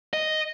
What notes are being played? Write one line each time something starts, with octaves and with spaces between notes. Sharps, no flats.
D#5